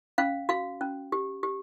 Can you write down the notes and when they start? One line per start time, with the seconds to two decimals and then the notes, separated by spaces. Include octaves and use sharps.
0.18 C#4 F5
0.49 F#4 F5
0.81 C#4
1.12 G4
1.43 G4